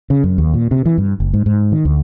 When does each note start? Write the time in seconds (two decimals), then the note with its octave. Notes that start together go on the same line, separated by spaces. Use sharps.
0.10 C#3
0.24 F#2
0.38 D#2
0.54 A#2
0.71 C3
0.86 E3
0.98 G2
1.20 F#1
1.34 G#2
1.46 G#2
1.72 D#3
1.85 D2